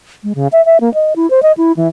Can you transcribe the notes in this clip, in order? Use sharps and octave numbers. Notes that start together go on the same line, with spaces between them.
G#3
C#3
E5
E5
A#3
D#5
E4
C5
D#5
E4
E3